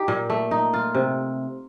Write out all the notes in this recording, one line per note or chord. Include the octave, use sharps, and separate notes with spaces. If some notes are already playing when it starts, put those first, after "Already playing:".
Already playing: D#4 G4
A#2
A3
D#4
F4
C3